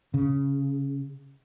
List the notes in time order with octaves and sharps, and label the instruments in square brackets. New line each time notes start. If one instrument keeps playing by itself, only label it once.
[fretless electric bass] C#3